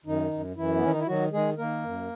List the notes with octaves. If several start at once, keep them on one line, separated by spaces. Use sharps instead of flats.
F#2 D#3 D#4
F#2
F#2 E3 E4
B3
D#3 C#4
D#4
E4
D#3 F#3 F#4
D#3 G#3 G#4
D#3 A#3 A#4
F#2